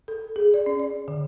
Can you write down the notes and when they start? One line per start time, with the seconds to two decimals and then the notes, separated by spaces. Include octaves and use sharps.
0.08 A4
0.36 G#4
0.54 D5
0.66 C#4
0.80 D5
1.08 D3